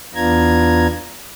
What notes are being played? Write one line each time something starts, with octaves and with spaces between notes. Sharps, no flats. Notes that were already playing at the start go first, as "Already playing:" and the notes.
E2 B3 D4 F4 A#5 G#6